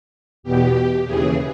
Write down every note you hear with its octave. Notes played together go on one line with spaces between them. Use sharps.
E2 B2 G4
D#2 C#3 E3 G#4